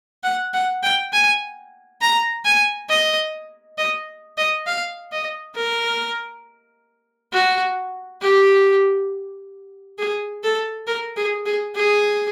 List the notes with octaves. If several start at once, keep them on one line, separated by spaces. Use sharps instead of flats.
F#5
F#5
G5
G#5
A#5
G#5
D#5
D#5
D#5
F5
D#5
A#4
F#4
G4
G#4
A4
A#4
G#4
G#4
G#4